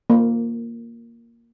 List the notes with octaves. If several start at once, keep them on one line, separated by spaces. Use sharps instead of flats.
A#3